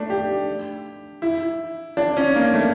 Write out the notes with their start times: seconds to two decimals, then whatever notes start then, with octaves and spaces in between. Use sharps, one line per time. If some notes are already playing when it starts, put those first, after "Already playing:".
Already playing: A3 D4
0.10 G4
1.22 E4
1.97 D4
2.17 C#4
2.35 A#3
2.54 A3